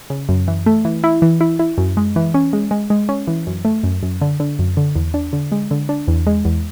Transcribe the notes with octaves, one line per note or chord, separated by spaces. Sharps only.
C#3
F#2
E3
A3
E3
E4
E3
E4
E4
F#2
G#3
E3
C#4
G#3
G#3
G#3
C#4
E3
F#2
A3
F#2
F#2
D3
D3
F#2
D3
E2
D4
D3
G#3
D3
D4
E2
G#3
E2